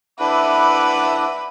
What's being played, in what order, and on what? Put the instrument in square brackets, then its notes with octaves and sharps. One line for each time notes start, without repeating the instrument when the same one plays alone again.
[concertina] D4 E4 [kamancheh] B4 [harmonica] E5 F#5 D6